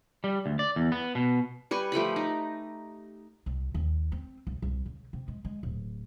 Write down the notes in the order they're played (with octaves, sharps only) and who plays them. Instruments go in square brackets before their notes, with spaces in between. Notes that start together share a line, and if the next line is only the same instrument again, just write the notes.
[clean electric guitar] G3
D2
D5
E2
B3
B2
[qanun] G3 B4 G#5 C#6
F3 A3 G4 B5
D#4
[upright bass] C2
D#2
C4
C2
C2
C#3
C3
G#3
G#3
D1